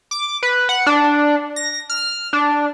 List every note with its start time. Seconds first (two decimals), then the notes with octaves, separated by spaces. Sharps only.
0.11 D6
0.43 B4
0.69 F#5
0.87 D4
1.56 A#6
1.90 F6
2.33 D4